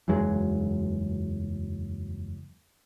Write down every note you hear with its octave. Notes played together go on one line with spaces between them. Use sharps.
F#1 E2 F#3 G#3